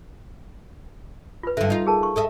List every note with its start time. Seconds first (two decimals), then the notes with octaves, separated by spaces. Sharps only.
1.43 F4 B4
1.57 G2 D3 E5
1.70 D#4 F4
1.87 G#4 A#4 A5
2.03 C#6
2.16 A4 D#5 E5